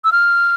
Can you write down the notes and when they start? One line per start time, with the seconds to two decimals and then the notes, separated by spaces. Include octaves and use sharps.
0.04 E6
0.12 F6